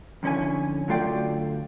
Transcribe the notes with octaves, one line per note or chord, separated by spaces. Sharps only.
F2 D3 C#4 E4 G#5
D2 F#3 A3 F4 D5 G5